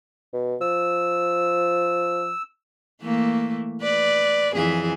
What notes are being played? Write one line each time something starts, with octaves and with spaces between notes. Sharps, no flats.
B2
F3 E6
E3 A3 A#3
B4 D5
F2 E3 G#4